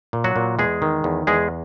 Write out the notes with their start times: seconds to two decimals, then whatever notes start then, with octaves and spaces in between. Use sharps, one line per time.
0.13 A#2
0.24 F#3 F#4
0.36 A#2
0.59 E2 G#3 G#4
0.82 D#3
1.04 E2
1.27 E2 G#3 G#4